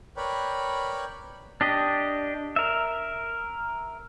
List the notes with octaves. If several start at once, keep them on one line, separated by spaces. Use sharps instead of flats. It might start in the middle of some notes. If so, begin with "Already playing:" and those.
A#4 B4 C#5 D5 G5 B5
D4 G4 D#5
A#4 E5